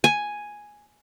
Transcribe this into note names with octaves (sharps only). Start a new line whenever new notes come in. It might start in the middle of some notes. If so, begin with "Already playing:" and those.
G#5